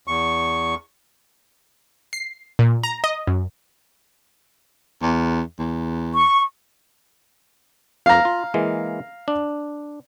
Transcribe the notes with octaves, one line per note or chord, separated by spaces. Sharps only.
E2 C#6
C7
A#2
A#5
D#5
F#2
E2
E2
C#6
F2 F5 A#5
F4
E3 G#3 A#3
D4